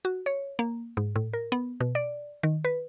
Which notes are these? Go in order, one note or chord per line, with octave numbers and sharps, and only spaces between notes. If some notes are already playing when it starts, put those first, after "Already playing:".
F#4
C#5
A#3
G#2
A2
A#4
B3
B2
D5
D#3
B4